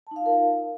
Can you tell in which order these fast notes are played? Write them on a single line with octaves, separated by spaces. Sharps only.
A5 D#4 F5 F4 A#4